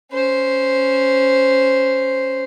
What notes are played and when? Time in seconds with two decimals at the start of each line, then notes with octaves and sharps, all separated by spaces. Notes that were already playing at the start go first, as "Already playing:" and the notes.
0.12 C#4 C5